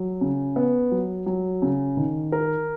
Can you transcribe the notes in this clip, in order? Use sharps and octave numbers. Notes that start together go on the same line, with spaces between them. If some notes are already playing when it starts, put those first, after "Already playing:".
Already playing: F#3
C#3
B3
F#3
F#3
C#3
D#3
A#4